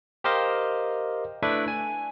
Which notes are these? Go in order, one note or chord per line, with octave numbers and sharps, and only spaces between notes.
G4 A#4 C5 D#5 F5
A3 D4 E4 B4 E5
G#5